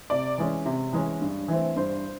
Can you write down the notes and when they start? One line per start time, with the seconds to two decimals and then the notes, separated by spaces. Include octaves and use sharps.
0.10 C3 D5
0.38 E3 G#3 C#4
0.66 C3
0.93 E3 G#3 C#4
1.21 G2
1.48 E3 A3 C4
1.76 G2 C5